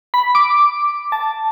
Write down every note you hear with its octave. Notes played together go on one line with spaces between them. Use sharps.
B5
D6
A5